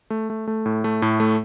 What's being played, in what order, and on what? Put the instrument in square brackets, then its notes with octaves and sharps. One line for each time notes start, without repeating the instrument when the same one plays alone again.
[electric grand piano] A3
A3
A3
A2
A3
A2
A3